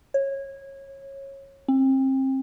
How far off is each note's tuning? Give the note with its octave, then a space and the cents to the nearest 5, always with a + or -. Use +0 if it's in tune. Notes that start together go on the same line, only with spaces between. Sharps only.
C#5 -20
C4 +30